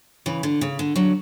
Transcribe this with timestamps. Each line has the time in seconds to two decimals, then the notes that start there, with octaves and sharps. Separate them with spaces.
0.26 C#3 E3
0.43 D3
0.61 C#3
0.79 D3
0.96 D3 F#3